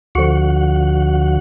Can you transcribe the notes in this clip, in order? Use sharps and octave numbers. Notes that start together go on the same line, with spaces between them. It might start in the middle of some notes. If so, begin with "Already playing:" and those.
D2 D3 F3 F#4 F#5